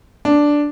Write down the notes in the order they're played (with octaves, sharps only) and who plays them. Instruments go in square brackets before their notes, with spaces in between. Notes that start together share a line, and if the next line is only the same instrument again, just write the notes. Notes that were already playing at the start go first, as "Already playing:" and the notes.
[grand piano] D4